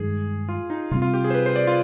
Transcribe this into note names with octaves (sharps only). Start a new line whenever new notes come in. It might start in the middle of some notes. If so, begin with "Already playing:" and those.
Already playing: G2 D#3 G#3 G#4
F4
D#4
C3 G3 C4 F4
F4
G4
G#4
C5
B4
C5
D5
F4